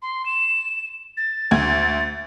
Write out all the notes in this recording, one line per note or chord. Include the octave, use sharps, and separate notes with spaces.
C6
E7
A6
D2 G#6